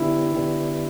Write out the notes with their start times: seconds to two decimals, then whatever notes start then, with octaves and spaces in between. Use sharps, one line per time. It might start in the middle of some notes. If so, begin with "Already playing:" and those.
Already playing: D3 B3 D4 E4 G4
0.35 D3 B3 D4 G4